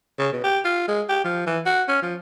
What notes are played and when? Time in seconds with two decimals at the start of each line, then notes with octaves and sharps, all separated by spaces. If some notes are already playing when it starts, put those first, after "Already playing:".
0.19 C#3
0.33 B2
0.44 G4
0.65 F4
0.88 G#3
1.09 G4
1.24 F3
1.47 E3
1.66 F#4
1.88 C#4
2.02 F3